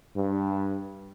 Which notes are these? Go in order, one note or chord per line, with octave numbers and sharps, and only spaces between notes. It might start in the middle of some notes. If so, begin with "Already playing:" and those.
G2